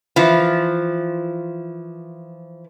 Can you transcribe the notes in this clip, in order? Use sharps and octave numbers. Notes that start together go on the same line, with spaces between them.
E3 F3